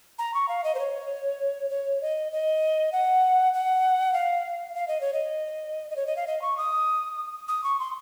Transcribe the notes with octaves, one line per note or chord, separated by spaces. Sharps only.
A#5
C#6
F5
D#5
C5
C#5
C#5
D#5
D#5
F#5
F#5
F5
F5
D#5
C#5
D#5
D#5
C#5
D#5
F5
D#5
C#6
D#6
D#6
C#6
C6